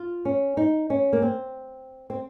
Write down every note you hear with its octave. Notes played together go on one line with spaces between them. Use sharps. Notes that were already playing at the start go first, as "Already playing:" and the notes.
Already playing: F4
C#4
D#4
C#4
A#3
C4
C4